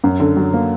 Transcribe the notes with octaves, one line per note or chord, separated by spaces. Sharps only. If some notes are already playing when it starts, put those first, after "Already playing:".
F#2
D3
F#3
A#3